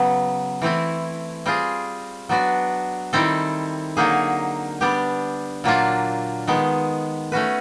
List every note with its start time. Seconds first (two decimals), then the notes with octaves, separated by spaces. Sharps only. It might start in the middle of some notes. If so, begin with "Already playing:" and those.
Already playing: C#3 F#3 B3
0.62 E3 A3 C4 E4
1.46 G3 C4 F4 G#4
2.29 F#3 B3 D4 F#4
3.13 D#3 G3 C4 E4 A4
3.97 D3 F#3 A#3 D#4 G#4
4.81 G3 B3 D4 G4
5.64 A#2 F#3 A#3 D4 F4
6.47 D#3 G#3 B3
7.32 A3 C#4 F#4 B4